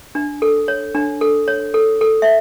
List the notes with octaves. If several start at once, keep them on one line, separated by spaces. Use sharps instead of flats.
D4
A4
C#5
D4
A4
C#5
A4
A4
E5